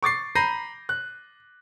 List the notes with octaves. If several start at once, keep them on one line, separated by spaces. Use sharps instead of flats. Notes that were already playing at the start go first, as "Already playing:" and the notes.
C#6 D6 A6 C7
A#5 B5 G6 A#6 C7 D#7
F#6